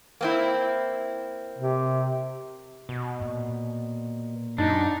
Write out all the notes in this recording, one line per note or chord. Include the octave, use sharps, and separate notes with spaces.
A#3 C4 E4
C3
B2
A#2
F#2 D4 D#4